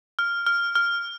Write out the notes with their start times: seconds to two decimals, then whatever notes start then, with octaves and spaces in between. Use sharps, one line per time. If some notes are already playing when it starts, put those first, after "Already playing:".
0.19 F6
0.47 F6
0.75 F6